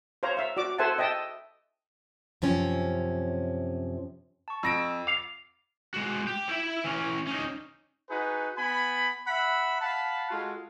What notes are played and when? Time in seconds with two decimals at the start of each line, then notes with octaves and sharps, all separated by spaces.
0.23 C5 C#5 F5 A#5
0.37 E5 F5
0.57 F#4 D5 D6
0.78 A4 C5 E5 F#5 G#5 A5
0.98 D#5 E5 G5 A5
2.42 F#2 C3 F3 C#4
4.48 A5 C#6
4.63 F2 E6 A#6 D7
5.07 F5 D6
5.94 G#3 F#4
6.27 G4
6.49 E4 E5
6.85 E3 C#4
7.27 C#4 D#4
8.10 D#4 F#4 G#4 B4
8.57 B3 G#5 B5
9.27 E5 F#5 B5
9.81 F5 F#5 A5 B5
10.30 G#3 F4 F#4 A4